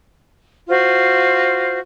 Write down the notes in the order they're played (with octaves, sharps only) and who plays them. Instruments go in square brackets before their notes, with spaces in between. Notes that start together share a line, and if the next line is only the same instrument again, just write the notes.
[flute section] F4 F#4 C5